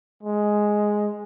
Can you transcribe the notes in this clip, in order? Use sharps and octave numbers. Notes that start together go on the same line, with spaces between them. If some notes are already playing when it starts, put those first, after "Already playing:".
G#3